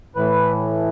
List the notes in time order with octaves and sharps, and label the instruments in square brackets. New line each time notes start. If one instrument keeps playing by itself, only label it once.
[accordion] A2 E3 B4